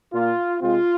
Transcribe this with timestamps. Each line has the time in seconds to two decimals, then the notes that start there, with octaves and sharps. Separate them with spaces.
0.13 A#2 A#3 F4
0.61 C3 G#3 C4 F4